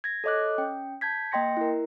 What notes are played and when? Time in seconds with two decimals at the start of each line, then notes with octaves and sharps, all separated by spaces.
0.04 G#6 A#6
0.24 A4 C#5 D#5 D6 F#6
0.58 C#4 G5
1.01 A5 G6 G#6 B6
1.32 A#3 D#5 G5 C6 A#6 C#7
1.57 E4 A#4